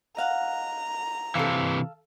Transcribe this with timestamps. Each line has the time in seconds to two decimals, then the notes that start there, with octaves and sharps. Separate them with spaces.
0.17 D#5 F5 F#5 A#5
1.35 C3 E3 A4 F5